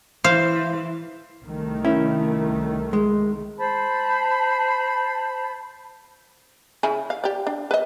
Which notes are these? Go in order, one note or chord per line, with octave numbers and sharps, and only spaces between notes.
E3 C5 F5
C2 D#3 A3
C#4 E4
G#3
C5 A5 B5
C#3 E4 G#5
F5
G4 D5
D4
B4 D#5